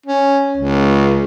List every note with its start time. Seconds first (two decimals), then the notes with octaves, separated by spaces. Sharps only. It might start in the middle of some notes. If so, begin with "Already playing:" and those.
0.06 C#4
0.57 C#2